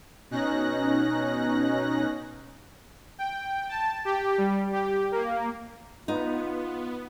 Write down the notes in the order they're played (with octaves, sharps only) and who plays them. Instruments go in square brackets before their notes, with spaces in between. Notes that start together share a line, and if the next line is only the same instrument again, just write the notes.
[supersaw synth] B2 C#4 D#4 F#6 A#6
G5
A5
G4
G3
G4
A#3
[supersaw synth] B3 [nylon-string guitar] D#4 [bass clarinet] F4